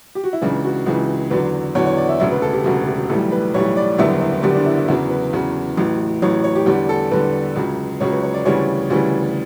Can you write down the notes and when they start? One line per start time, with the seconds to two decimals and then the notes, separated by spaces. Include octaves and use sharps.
0.15 G4
0.24 F#4
0.33 E4
0.41 C#2 C#3 E3 D4
0.64 F#4
0.86 C#2 C#3 E3
1.30 E2 D3 F#3 B4
1.75 E2 D3 F#3 C#5
1.86 C#5
1.97 D5
2.09 E5
2.20 E1 D2 C#3 E5
2.32 B4
2.42 A4
2.53 G4
2.64 E1 D2 C#3 F#4
2.87 G4
3.09 B1 A2 E3 G3 A4
3.32 B4
3.54 B1 A2 E3 G3 C#5
3.77 D5
3.98 F#1 E2 D3 G3 E5
4.21 E5
4.43 F#1 E2 D3 G3 G4
4.54 D4
4.66 E4
4.77 E4
4.88 E2 C#3 F#3 E4
5.10 B4
5.33 E2 C#3 F#3
5.77 A1 A2 F#3
6.22 A1 A2 F#3 C#5
6.44 C#5
6.55 G4
6.66 E2 D3 G3 G4
6.89 A4
7.11 E2 D3 G3 B4
7.56 C#2 C#3 F#3
8.00 C#2 C#3 F#3 C#5
8.12 B4
8.23 C#5
8.34 D5
8.45 D2 C#3 E3 G3 C#5
8.90 D2 C#3 E3 G3